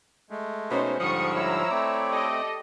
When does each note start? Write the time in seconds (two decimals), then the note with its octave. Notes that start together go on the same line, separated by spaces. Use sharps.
0.31 G#3 A3
0.70 B2 C#4 D#4 C5
1.00 G#2 D3 F3 G3 C#6 D#6 C#7
1.35 E4 C#5 A#5 E6
1.71 A3 C4 D5
2.10 G4 A4 D#5